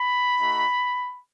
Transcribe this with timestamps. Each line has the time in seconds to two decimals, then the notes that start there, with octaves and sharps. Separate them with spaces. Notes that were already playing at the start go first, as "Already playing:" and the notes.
Already playing: B5
0.39 A3 D#4 F#4